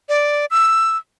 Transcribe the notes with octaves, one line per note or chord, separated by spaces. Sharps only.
D5
E6